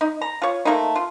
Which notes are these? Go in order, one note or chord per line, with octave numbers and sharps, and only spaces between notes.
D#4
A#5
F4 C#5
A3 A#3 C4 D#4
F4